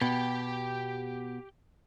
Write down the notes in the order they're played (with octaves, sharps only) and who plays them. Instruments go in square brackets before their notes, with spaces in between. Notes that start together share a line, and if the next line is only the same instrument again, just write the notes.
[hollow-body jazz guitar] B2 [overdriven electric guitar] G4 G5